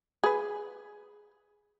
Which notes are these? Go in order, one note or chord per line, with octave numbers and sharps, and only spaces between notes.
G#4 B4